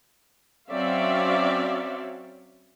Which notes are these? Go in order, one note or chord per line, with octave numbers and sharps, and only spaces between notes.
F#3 C4 C#4 D5 E5 F5